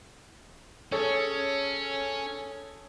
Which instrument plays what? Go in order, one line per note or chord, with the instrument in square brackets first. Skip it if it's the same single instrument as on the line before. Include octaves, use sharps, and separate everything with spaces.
[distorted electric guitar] C#4 [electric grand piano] G#4 A4 C#5